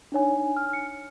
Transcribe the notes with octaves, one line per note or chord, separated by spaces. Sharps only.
D4 D#4 C#5 G#5
F6
C#7